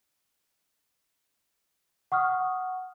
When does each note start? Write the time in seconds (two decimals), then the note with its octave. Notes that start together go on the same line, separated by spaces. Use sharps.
2.12 F#5 C#6 D#6 F6